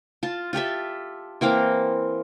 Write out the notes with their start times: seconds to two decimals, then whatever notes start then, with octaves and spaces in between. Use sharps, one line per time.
0.23 F4 A5
0.53 F4 G4 A4 E5
1.41 E3 A#3 C4 F5